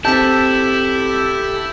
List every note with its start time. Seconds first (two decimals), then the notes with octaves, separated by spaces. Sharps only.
0.05 C4 E4 G4 A4 A5 G6 B6